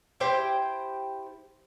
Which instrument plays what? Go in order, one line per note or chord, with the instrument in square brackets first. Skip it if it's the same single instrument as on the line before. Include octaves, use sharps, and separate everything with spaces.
[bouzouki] E4 G4 C5 G5